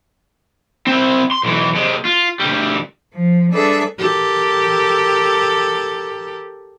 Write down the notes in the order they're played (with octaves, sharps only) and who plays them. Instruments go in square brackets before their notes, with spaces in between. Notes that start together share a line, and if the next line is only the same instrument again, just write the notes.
[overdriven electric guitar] C4 E4
C6
B1 E3
C3 G#3
F4
D2 G3
[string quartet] F3
G3 D4 G#4 A4 B4 E5
[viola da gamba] G4 A4 A#4